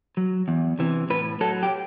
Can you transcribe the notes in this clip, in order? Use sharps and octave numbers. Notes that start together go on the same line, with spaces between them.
F#3
E2
C3 E3
A2 B4
F#3 A4
G4